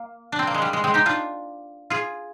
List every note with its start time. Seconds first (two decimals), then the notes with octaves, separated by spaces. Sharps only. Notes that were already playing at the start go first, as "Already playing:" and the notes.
Already playing: A#3
0.32 D4
0.39 C4
0.47 A#3
0.54 G#3
0.62 G3
0.73 G#3
0.84 G#3 C4
0.94 D#4 G4
1.06 D4 F4
1.90 F4 G#4